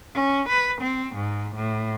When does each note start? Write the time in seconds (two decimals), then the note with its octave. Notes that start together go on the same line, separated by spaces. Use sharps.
0.15 C#4
0.49 B4
0.81 C4
1.15 G#2
1.56 A2